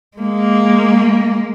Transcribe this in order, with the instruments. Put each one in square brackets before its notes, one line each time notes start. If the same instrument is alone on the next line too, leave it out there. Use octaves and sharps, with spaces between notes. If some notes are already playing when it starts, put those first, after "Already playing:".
[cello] G#3 A#3